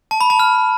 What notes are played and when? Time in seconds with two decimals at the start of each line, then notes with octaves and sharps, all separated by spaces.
0.11 A5
0.21 B5
0.30 A5
0.39 F6